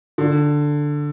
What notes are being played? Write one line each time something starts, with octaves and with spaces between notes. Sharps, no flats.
D3